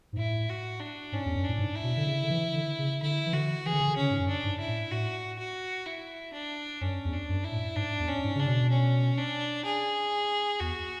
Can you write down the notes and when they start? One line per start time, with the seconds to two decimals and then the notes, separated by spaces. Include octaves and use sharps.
0.13 G#2
0.17 A2 E4
0.49 F#4
0.80 D4
1.12 G#2 C#4
1.25 E2
1.36 F#2
1.44 D4
1.49 A2
1.59 G#2
1.76 E4
1.83 B2
1.97 D3
2.06 C#3
2.23 D3
2.30 E3
2.54 D3
2.79 C#3
3.02 D3 E4
3.26 E3
3.33 D3 F#4
3.65 E3 G#4
3.73 D3
3.80 C#3
3.87 D3
3.96 C#3 C#4
4.10 G#2
4.20 F#2
4.28 D4
4.44 G#2
4.60 E4
4.68 A2
4.91 A2 F#4
5.39 F#4
5.86 E4
6.33 D4
6.81 F#2 C#4
7.05 E2
7.13 D4
7.29 F#2
7.44 E4
7.52 A2
7.76 G#2 D4
7.99 E2
8.08 C#4
8.24 G#2
8.35 C#3 D4
8.47 B2
8.70 C#4
9.18 D4
9.65 G#4
10.60 E2 F#4